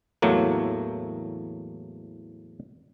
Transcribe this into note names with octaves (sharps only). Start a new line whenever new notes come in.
E2 A2 F#3 A3 A#3